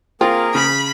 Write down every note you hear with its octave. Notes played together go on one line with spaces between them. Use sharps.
A#3 C4 F4 G#4 A#4
C#3 B5